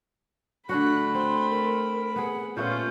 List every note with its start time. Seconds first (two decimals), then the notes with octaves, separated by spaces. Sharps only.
0.69 D3 A3 D4 F#4 B5 F#6
1.14 C4 C6
1.51 A#4
2.16 B3 G#4 F#5
2.57 A#2 A3 B3 C#4 F4 G6